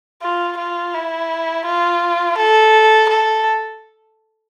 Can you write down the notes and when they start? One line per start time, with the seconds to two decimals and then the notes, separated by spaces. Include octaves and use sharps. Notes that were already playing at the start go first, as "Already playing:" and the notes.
0.22 F4
0.58 F4
0.94 E4
1.66 F4
2.37 A4
3.09 A4